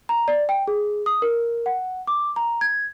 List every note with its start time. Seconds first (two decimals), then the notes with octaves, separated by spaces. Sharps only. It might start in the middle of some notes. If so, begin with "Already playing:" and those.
0.09 A#5
0.28 D5
0.49 G5
0.68 G#4
1.06 D#6
1.22 A#4
1.66 F#5
2.07 D6
2.36 A#5
2.61 G#6